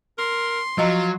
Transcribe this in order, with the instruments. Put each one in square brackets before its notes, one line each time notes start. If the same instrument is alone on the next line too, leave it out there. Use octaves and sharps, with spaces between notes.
[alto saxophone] A#4 [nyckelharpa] C6
[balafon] F3 D#5 A#5 [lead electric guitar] F#3 [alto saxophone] F4